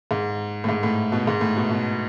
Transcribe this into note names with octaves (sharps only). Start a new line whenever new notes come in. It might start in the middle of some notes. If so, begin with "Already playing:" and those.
G#2
A2
G#2
A2
B2
G#2
A2
B2
B2